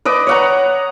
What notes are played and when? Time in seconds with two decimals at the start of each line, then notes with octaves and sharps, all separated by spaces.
0.05 B4 D5 D#5 D6
0.27 C#5 F#5 A#5